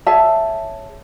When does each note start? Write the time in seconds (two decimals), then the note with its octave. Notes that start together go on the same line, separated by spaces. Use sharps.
0.06 G#4 C#5 E5 A5